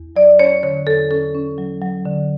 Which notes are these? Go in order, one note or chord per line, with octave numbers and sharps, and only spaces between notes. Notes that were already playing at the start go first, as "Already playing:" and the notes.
Already playing: E2
F#3 D5
C#4 C#5
D3 C#5
E2 A4
C#4 A4
C#4
F#3
F#3
D3